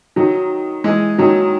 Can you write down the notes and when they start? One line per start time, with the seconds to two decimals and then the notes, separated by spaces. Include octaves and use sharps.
0.16 D#3 F#3
0.84 E3 G#3
1.18 D#3 F#3